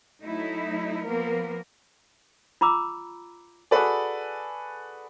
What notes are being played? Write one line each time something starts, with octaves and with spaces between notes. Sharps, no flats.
F#3 A3 D#4 E4
F3 A#3 B3 A#4
F4 A#5 B5 D6 E6
F#4 G#4 A4 B4 D5